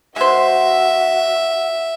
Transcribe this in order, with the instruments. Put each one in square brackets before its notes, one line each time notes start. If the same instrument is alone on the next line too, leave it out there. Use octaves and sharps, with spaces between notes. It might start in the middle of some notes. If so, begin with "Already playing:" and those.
[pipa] G#3 C5 [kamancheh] F#4 [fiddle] E5